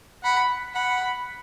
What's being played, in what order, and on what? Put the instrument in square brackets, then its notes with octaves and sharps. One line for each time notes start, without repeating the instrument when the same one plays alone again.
[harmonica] F#5 [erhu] B5
[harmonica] F#5 [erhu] B5